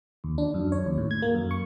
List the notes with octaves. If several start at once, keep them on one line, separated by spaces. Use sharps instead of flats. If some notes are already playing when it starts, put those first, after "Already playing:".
D#2
D4
F#2
C#5
D#2
A2
G#6
A#3
F#2
C#6